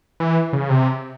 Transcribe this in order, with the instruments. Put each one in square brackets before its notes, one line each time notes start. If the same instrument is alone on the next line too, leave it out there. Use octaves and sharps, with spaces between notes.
[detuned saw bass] E3
C#3
C3